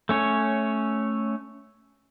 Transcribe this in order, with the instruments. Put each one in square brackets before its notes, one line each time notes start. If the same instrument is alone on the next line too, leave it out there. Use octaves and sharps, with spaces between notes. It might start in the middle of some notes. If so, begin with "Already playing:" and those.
[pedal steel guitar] A3 C#4 C#5